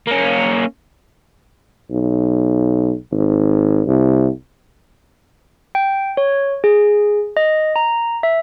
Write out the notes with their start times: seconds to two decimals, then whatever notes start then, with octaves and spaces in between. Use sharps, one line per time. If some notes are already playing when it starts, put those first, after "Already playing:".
0.07 A#3 C#4
1.91 B1
3.11 G#1
3.87 C2
5.75 G5
6.17 C#5
6.64 G#4
7.37 D#5
7.76 A#5
8.23 E5